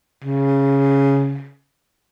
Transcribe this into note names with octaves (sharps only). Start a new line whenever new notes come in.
C#3